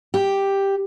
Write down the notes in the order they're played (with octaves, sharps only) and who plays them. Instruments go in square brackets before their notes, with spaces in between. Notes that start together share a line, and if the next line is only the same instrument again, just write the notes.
[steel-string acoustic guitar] G4